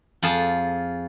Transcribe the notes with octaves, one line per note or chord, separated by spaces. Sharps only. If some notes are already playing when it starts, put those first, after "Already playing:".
F2 F4 G#4 A5